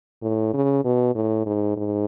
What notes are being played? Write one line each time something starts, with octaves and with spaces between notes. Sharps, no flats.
A2
C#3
B2
A2
G#2
G#2